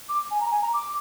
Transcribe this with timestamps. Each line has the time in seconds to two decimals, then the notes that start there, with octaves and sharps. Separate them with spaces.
0.09 D6
0.31 G#5
0.40 A#5
0.51 G#5
0.62 A#5
0.73 D6